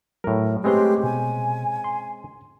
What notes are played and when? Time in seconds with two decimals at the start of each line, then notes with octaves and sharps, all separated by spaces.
0.24 A2 F#3 A#4
0.64 G#3 A3 C4 C#4 G4 B4 C6
1.04 B2 G#5
1.84 C6